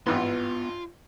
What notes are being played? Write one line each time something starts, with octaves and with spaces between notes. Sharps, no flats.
G#1 G2 E3 B3 F4 C6